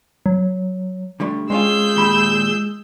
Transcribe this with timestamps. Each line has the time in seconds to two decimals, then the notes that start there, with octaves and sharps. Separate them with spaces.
0.26 F#3
1.20 D3 G3 A3
1.50 G#3 C4 C#4 F4 G#4 E6 G6
1.96 D#2 A#2 B5